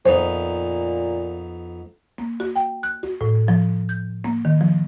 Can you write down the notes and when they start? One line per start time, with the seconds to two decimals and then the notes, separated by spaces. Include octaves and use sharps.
0.05 F2 A#2 B3 D#4 C5
2.18 A#3
2.40 F#4
2.56 G5
2.83 F#6
3.03 F#4
3.21 A2
3.48 F3
3.89 G6
4.24 A#3
4.45 D#3
4.61 F3